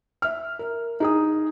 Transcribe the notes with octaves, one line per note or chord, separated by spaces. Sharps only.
E5 F6
A#4
D#4 G#4 D#6